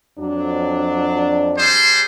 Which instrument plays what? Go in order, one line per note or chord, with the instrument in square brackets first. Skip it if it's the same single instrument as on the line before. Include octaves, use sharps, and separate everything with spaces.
[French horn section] F2 F#3 D4
[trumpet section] G3 G#4 C5